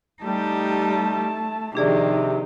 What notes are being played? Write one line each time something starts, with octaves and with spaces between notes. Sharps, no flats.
G3 A3 D#4 G4 A5
C3 D#3 F3 D4 D#4 G4 G#4 D5